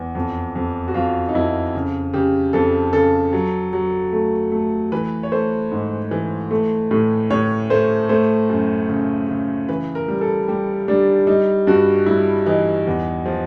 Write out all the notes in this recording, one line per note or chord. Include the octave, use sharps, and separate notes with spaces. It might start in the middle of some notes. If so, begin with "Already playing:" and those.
Already playing: E2
F2
F2
F#4
F2 F4
D#4
F2 E4
C#3
C#3 G4
F2 A4
C#3 A4
F#3
F#3
A3
A3
E3 B4
C#5
A3 C5
G#2
E3
A3
A2
A2 C#5
A3 C5
A3 C5
F#2
C#3
C#3
E3 B4
A#4
G3
A4
G3 G4
G3 D4
G3 D#4
G2 F#4
G3 E4
E3 D#4
E2
F3